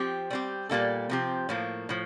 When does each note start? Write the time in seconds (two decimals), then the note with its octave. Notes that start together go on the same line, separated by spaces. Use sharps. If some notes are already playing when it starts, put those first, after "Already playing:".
Already playing: F3 C4 G4
0.30 G3 C4 G4
0.69 A#2 G3 A#3 D#4 A4
1.10 C3 F3 C4 G4
1.49 A2 F3 A#3
1.89 A2 F3